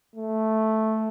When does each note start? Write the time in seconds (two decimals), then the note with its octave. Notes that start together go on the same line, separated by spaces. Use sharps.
0.16 A3